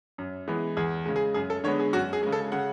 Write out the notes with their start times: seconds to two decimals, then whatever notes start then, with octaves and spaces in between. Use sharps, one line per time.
0.18 F#2
0.48 E3 G#3 B3
0.77 E2 G#4
1.06 C#3 G#3
1.16 G#4
1.34 F#2 G#4
1.50 A4
1.64 D3 G#3 B3 C#5
1.79 G#4
1.93 F#2 F#4
2.13 G#4
2.23 C#3 G#3
2.32 A4
2.52 C#3 F#5